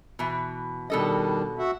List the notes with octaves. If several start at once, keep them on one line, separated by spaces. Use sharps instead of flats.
B2 E3
B2 D#3 G3 D4 A4 D#5
F#4 E5 F#5